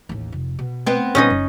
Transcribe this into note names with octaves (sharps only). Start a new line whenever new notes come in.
A1 D#2
F1
B2
B3 C4
A#2 G3 C#4 D#4 D#5
F#1